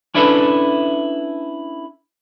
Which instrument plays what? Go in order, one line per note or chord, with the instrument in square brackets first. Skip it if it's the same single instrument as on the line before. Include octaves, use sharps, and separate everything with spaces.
[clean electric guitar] C#4 D4 E4 A4 B4 E5